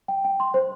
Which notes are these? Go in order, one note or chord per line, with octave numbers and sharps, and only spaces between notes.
G5
G5
C6
C5